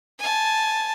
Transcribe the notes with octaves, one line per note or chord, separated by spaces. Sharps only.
G#5 A5